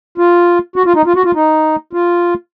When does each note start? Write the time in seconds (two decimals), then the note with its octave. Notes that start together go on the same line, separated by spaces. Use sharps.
0.18 F4
0.76 F#4
0.86 F4
0.95 D#4
1.06 F4
1.16 F#4
1.25 F4
1.35 D#4
1.93 F4